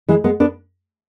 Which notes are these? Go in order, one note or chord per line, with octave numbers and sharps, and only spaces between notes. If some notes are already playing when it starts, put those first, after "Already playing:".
E3 G#3
G#3 B3
B3 D4